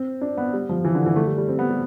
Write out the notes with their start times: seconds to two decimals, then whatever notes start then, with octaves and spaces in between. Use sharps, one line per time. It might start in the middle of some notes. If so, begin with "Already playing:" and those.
Already playing: C4
0.21 D4
0.37 B3
0.53 G3
0.69 F3
0.85 E3
0.95 D3
1.06 E3
1.16 A3
1.27 G3
1.38 G3
1.48 C4
1.59 B3
1.70 G3